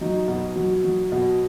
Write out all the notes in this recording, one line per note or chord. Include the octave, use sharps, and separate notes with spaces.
F#3 D#4
B2
F#3
F#3
B2